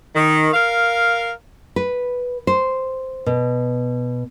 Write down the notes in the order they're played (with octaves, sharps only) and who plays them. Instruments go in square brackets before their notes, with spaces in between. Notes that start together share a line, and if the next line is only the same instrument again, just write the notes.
[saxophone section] D#3
A#4 F5
[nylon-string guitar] B4
C5
B2